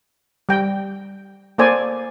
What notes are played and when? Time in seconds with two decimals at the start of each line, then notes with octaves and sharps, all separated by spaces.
0.49 G3 G5
1.58 A#3 A4 C5 D5 G#5